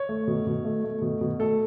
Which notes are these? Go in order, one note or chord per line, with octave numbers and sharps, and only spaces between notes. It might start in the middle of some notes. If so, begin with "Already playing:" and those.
Already playing: C#5
A3
B2
B2
A3
A3
B2
B2
A3 A4